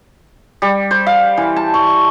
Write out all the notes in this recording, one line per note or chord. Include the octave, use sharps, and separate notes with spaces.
G3
C5
F5
E3
A5
C#6